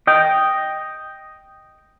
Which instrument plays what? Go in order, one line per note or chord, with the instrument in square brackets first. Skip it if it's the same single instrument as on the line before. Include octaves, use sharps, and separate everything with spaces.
[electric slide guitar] D#5 G5